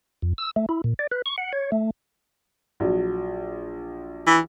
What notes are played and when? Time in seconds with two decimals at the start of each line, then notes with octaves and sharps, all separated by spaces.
0.22 F2
0.38 E6
0.56 A3
0.69 E4
0.84 A#2
0.99 D5
1.11 B4
1.26 C#6
1.38 F#5
1.53 C#5
1.72 A3
2.80 A#1 F#3
4.27 E3